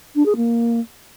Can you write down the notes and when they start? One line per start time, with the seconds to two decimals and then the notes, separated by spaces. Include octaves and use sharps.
0.15 D4
0.25 G#4
0.36 A#3